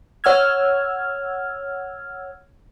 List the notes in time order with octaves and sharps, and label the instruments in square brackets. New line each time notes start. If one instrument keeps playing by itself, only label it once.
[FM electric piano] C#5 F#5 E6 F6 G#6